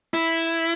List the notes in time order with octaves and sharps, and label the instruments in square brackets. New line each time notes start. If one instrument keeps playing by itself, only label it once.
[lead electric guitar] E4